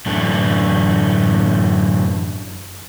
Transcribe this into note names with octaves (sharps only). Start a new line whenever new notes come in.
F#2 A2 D3 E3 A3 D4